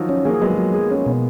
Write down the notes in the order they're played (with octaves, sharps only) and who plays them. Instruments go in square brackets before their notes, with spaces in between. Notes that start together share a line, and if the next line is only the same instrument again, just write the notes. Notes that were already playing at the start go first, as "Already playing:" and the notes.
Already playing: [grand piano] D#3 F3 F#3
[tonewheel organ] C#4
[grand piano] F#3 A#3 [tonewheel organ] G#4
[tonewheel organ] F#3 [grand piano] G#3 B3
[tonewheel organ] F#3
G#4
C#4
B2